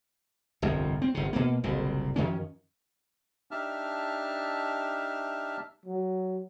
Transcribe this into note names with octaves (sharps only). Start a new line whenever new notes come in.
G1 C2 F2
C4
G1 C3
B2 A#3
F#1 C2 A#2
F#2 D#3 F3 C#4
D4 D#4 G4 E5 A5 F6
F#3